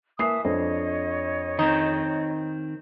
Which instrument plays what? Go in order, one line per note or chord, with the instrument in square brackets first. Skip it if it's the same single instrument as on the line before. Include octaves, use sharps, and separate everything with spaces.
[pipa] E3 [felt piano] A#3 C7 [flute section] E5 A5 D#6
[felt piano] F2 D4 C5 [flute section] C#5 D#5
[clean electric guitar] D#3 C4 [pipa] D#4